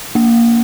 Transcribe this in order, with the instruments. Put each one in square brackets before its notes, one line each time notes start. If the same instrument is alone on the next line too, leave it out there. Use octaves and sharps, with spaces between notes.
[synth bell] A#3